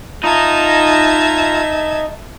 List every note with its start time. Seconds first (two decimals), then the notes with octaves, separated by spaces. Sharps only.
0.24 D#4 F4 D#5 E5 A5 A#5 G#6